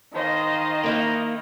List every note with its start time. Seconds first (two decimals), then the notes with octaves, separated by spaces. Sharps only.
0.15 D#3 C5 D#5 F5
0.84 A#3 D#4 E4